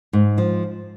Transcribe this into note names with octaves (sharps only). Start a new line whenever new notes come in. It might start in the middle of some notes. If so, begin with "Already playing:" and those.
G#2
F3